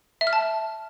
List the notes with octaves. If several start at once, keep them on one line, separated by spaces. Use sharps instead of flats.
E5
F6
A5